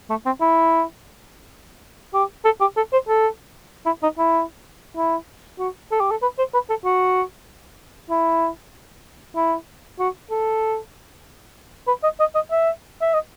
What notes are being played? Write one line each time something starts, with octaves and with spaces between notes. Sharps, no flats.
A3
C4
E4
G4
A4
G4
A4
C5
A4
E4
D#4
E4
E4
F#4
A4
G4
A4
B4
C5
B4
A4
F#4
E4
E4
F#4
A4
B4
D#5
D#5
D#5
E5
E5
D#5